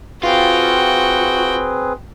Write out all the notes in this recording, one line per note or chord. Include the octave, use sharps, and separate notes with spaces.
C4 F4 F#4 G#4 B4 G5